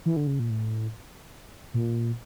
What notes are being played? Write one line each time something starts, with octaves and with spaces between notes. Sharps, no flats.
E3
D3
C#3
A#2
A2
A#2